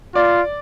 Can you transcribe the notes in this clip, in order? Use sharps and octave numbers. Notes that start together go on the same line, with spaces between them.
F4 D5